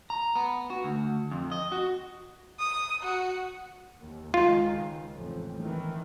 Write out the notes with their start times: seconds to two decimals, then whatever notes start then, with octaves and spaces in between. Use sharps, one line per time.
0.10 A#5
0.36 B3
0.70 F#4
0.84 D2
1.31 F2
1.52 D#5
1.72 F#4
2.59 D#6
3.03 F#4
4.01 D#2
4.34 C#2 D#3 G#3 F4
4.71 C#2
5.14 A1 F2
5.60 D#3 E3